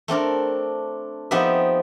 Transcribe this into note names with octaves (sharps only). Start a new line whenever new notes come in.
A3 C4 D4 A#4
F3 B3 C4 D#4 G4 E5